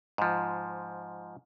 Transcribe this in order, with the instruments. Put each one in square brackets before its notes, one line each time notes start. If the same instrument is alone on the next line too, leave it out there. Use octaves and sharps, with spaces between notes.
[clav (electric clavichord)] G#2 F3